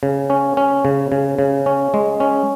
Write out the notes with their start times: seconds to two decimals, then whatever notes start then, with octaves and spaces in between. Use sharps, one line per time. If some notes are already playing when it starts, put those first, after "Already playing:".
0.03 C#3
0.30 C#4
0.57 C#4
0.85 C#3
1.12 C#3
1.39 C#3
1.66 C#4
1.94 G#3
2.20 C#4